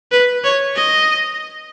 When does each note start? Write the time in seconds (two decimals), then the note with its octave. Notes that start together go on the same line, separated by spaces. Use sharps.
0.12 B4
0.44 C#5
0.76 D#5